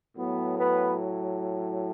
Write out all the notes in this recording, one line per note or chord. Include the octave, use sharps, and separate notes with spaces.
A2 F#3 B3
B3 B4